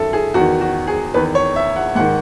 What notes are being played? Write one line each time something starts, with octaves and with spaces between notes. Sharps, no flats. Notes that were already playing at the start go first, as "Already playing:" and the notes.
Already playing: F#2 D#3 A4 E5
G#4
E2 D#3 F#4
F#4
G#4
E2 D#3 B4
C#5
E5
F#5
G#2 D#3 F#5